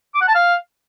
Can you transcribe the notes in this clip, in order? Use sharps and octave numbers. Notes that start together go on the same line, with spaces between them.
D6
F#5
A5
F5